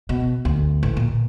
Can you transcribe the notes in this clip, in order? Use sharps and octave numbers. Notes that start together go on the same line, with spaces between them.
B2
D2
A1
A#2